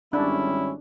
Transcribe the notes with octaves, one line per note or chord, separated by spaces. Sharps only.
G#1 G3 C#4 D4 E4